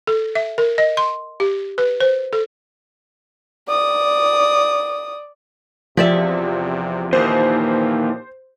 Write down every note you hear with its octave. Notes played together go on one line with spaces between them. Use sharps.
A4
E5
A#4
D#5
C6
G4
B4
C5
A4
D5 D#6
E2 C3 F3 G4 D5 E5
D#2 A#2 E3 F3 C5